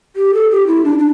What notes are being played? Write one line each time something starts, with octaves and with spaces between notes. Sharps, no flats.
G4
A4
G4
E4
D4
D4